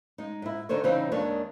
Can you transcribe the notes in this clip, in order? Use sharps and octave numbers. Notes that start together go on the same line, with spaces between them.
G#3 D#4
G#2 E4
D3 D#3 D#4 C5 C#5
C#3 E3 G3 C4 D#4
D#2 D#3 G#3 D4 C#5